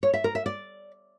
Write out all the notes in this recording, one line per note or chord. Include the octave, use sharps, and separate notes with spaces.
C#5
E5
A#4
E5
D5